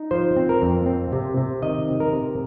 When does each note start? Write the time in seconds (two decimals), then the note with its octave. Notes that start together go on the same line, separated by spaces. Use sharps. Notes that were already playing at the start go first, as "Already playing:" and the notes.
Already playing: D#4
0.11 F3 C5
0.37 C4
0.49 A#4
0.62 F2
0.86 C4
1.13 C3
1.37 C3
1.62 D#3 D#5
1.88 C4
2.00 A#4
2.12 C3